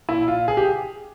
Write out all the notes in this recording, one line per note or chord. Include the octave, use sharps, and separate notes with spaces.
A#2 E4
F4
G#4
G4